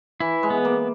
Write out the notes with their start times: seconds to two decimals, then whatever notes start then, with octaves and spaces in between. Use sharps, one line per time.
0.20 E3 E4
0.43 G#3
0.50 B3
0.65 A#3